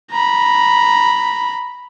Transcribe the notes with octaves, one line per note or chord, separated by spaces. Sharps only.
A#5 B5